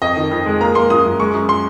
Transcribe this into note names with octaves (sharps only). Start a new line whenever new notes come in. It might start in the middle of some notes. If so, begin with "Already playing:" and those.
F2 D#5
D#3
F2
G#3
A#3 A#5
A#3 C6
F#2 D#6
F#2
G#3 C#6
F#2
C6